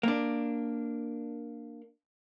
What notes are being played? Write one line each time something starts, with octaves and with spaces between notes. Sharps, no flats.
A#3 D4